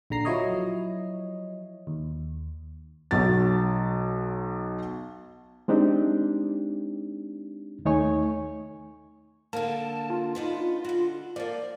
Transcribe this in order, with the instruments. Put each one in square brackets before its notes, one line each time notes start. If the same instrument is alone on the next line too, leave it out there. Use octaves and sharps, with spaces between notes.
[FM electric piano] A#1 D3 A#5 C7
F3 F#3 E4 C#5 D#5
D#2
[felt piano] B1 F#3 A6
[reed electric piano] G#3 C4 D4 D#4 G4
D#2 A3 D#4 C#5 G#5 C#6
[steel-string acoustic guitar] D3 A#3 [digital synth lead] A5
[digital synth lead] F4
[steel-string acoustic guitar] B3 D4 D#4
D3 F#4
[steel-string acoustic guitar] F3 A#3 [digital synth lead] D5